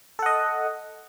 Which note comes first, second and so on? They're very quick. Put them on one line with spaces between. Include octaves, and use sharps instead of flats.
A4 F#5 D#5